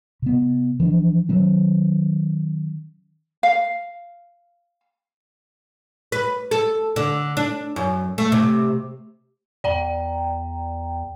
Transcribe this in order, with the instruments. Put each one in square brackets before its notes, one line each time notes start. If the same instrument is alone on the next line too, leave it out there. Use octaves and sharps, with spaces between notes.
[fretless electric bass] C3 B3
E3 F3 C4 D4
D#3 F#3 C#4
[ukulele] F5
[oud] B4
A4
D3
D4
F#2
A3
C3
[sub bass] E2 [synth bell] D5 G5 A#5